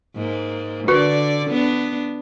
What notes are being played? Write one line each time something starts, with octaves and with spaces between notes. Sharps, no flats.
G#2 A#3
D3 F#4 B4 D5
B3 D4